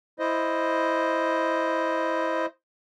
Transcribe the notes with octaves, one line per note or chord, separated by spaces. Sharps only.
E4 C5 D#5